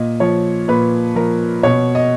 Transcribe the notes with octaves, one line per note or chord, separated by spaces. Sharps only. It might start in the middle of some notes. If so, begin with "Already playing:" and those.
Already playing: A#2 D#5
F3 C#5
A#2 B4
F3 A#4
B2 C#5
D#5